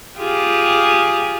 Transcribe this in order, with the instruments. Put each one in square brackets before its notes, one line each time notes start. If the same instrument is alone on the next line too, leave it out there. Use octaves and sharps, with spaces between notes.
[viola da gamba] F4 G4 G#4